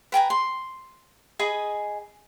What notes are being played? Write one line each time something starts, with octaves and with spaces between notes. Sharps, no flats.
B4 G5 G#5 A#5
C6
G#4 D#5 G#5 B5